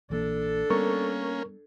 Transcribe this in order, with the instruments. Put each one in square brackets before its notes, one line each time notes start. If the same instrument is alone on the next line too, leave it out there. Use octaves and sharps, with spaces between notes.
[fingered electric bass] A#1 E3 A#3 [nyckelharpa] D4 A4
[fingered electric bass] G3 B3 [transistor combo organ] A#3 C#4 [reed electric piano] A#4 C#6